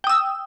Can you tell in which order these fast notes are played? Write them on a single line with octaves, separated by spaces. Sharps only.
G5 D#6 E6